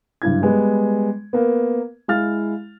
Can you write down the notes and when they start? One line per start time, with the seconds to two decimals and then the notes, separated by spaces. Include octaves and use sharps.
0.22 F#1 G2 E4 G#6
0.42 G3 G#3 B3
1.33 A#3 B3
2.08 G#3 E4 F5 F6 A6